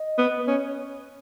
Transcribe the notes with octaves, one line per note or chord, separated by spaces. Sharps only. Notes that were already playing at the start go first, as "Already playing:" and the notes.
Already playing: D#5
B3
C#4